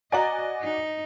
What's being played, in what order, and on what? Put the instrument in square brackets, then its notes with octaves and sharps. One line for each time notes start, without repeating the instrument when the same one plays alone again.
[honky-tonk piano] F#4 D5 G#5 [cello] D#5 [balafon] F#5 A#5
[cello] D#4